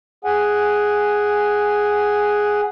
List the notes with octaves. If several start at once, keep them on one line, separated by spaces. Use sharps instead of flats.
G#4 F#5 G#5